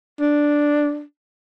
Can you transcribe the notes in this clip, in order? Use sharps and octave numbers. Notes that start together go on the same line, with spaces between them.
D4